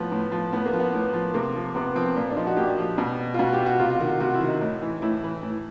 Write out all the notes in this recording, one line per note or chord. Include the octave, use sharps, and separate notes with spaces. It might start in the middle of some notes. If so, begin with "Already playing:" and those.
Already playing: A2 F3 B3
A2
F3
A2 B3
A#3
F3
B3
A2
F3
C3 A#3
F3
C3 B3
F3 C4
A#2
D4
F3 D#4
F#4
A#2 G4
F3
B2
F4
B2 F#4
G4
F#4
C3 F4
F4
D#3 F#4
C3 F#4
E4
D#3
D#4
A2
E3
A2 E4
E3
A2